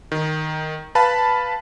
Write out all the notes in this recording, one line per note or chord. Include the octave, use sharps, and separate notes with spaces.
D#3
B4 F5 A5 B5